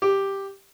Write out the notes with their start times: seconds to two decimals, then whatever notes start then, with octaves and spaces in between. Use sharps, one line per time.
0.02 G4